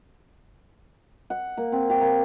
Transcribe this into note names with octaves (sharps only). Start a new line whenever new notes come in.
F#5
A#3
C4
G4
A#3